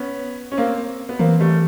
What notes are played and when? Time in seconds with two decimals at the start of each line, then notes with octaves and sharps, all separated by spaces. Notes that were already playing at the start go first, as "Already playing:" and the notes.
Already playing: B3 C#4
0.52 C#4
0.58 A#3 C4
1.09 B3
1.19 E3 A#3 C4
1.40 G3 A3